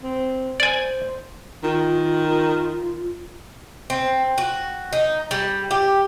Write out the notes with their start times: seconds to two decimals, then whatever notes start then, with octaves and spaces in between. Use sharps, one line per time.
0.02 C4
0.60 C5 D5 G#5
1.64 D#3 F4
3.90 C4
4.38 F#4
4.93 D#4
5.31 G3
5.71 G4